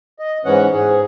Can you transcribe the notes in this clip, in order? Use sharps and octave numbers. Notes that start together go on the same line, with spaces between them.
D#5
G#2 E3 C#4 F#5
G#2 G#4